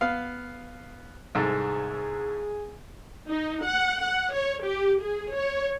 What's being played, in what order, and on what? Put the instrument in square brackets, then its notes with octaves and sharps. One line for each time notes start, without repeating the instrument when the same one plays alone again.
[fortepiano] B3 F5
[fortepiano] C2 G#2 A4 [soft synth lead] G#4
[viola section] D#4
F#5
F#5
C#5
G4
G#4
C#5